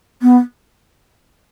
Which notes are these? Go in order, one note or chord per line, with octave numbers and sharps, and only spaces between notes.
B3